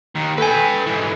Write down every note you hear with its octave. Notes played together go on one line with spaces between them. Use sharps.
D#2 D#3
A4 B4 G5 G#5
G#2 E3